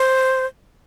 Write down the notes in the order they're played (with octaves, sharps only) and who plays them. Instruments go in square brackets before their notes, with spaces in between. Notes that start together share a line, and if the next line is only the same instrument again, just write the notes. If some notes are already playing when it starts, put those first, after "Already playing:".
Already playing: [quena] C5